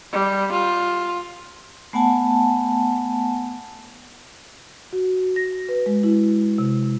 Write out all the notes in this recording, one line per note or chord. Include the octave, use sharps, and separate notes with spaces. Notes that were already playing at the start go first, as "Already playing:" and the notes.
G3
F4
A3 B3 F#5 G#5 A5
F#4
A#6
B4
G#3
E4
C3